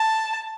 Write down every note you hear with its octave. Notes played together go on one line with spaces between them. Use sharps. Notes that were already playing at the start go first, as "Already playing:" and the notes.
Already playing: A5